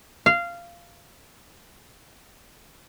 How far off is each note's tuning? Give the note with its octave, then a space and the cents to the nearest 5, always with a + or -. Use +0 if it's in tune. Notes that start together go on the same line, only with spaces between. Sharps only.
F5 -15